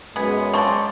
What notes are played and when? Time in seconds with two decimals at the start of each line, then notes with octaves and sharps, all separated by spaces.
0.16 F#2 G#3 B3 G#5
0.54 F3 F#3 D5 C6 C#6